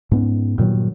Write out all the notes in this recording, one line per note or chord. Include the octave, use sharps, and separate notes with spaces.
G#2 B3 C#4
G2 A#2 D#3 F#3